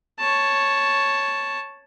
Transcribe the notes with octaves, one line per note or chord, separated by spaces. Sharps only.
C#5 A5